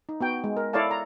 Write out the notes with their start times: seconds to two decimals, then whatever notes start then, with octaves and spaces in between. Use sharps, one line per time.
0.09 D#4
0.21 B3 F#4 G5
0.44 G#3
0.57 A#4
0.73 E4 A4 C#5 D5 F5 A5
0.91 A#5